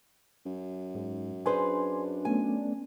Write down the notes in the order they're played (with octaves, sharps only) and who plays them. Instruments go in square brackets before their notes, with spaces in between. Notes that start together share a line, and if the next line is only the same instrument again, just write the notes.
[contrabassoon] F#2
[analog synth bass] G#2
[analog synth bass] D4 [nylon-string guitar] G#4 B4 C5 [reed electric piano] G#5 C6
[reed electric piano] A3 B3 C#4 [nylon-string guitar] G#5